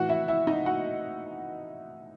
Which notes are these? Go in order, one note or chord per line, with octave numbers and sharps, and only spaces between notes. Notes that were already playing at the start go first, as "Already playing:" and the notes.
Already playing: A2 E3 F#4 F#5
E4 E5
E4 E5
D#4 D#5
F#4 F#5